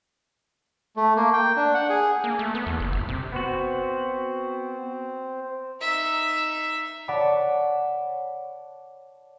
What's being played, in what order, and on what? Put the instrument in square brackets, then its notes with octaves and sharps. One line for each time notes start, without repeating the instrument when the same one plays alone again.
[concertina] A3
A#3
G5
D4
F#5
G#4
[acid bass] A#3
A3
B3
E2
F#1
G1
C3
[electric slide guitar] B3 F#4 [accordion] C4 C5
[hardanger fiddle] D#4 E5
[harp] C#5 D5 F#5 A5 B5